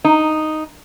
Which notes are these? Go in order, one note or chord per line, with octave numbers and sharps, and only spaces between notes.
D#4